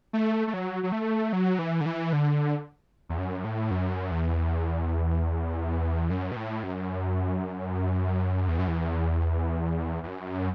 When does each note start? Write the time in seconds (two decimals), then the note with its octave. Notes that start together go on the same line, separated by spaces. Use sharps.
0.13 A3
0.47 A3
0.54 F#3
0.83 F#3
0.92 A3
1.33 F#3
1.59 E3
1.81 D3
1.86 E3
2.13 D3
3.09 E2
3.18 F#2
3.45 A2
3.71 F#2
4.11 E2
6.10 F#2
6.32 B2
6.36 A2
6.63 F#2
8.48 E2
8.58 F#2
8.68 E2
10.03 E2
10.07 F#2